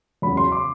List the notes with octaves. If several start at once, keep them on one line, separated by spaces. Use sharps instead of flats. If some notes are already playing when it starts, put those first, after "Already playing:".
E2 C#3 F#3 B5
C6
D6